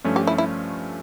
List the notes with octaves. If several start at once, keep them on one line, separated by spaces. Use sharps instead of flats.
G2 F3 A3 C#4 F4
G4
E4
E4